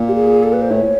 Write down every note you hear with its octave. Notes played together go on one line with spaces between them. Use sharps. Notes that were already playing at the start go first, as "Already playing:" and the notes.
Already playing: A#2
G4
G#4
A4
B4
C5
A2 C#5